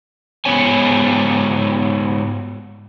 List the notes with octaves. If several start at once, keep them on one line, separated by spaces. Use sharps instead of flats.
G#2 G#3 B3 C#5 G#5